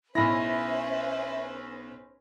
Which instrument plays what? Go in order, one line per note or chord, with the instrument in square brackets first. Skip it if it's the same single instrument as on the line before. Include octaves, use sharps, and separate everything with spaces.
[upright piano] B1 B5 A#6 [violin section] C#4 B4 C5 [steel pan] E4 [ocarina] E5